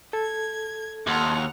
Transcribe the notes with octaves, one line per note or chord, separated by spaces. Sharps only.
A4 G#6
D#2 F#5 A5 C6 F7